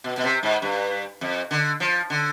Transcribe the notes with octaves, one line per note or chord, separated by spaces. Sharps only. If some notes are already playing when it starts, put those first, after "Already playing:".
B2
B2
C3
G#2
G2
F2
D3
F3
D3